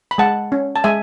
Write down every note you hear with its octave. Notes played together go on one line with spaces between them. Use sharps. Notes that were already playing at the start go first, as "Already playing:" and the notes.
B5
G#3 F#5 A5
C#4
A5
G#3 E5 G#5